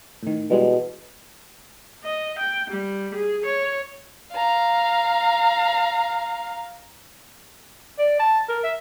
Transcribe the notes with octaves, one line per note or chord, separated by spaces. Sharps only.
A2 D#3
B2 E3 G3 G#3
D#5
G5
G3
G#4
C#5
F5 A#5
D5
A5
A#4
E5